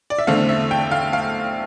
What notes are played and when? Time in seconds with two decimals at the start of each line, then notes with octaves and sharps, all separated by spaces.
0.10 D5
0.18 E5
0.27 E2 D3 A3 C4 F5
0.49 E5
0.71 G5
0.91 F5
1.13 F5